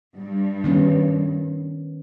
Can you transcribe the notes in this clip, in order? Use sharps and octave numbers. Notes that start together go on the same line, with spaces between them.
G2
D#3 B3 C#4